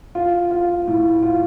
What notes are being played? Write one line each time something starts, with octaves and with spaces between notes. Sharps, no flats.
F4
F4
A2
F4